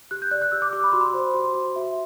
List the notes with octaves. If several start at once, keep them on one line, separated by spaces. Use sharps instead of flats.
G4 F#6
G6
D5 F#6
F#6
G4 E6
D6
G4 D6
B5
F#4 C6
B5
C5
F#4 C6
F#4
F#4 E5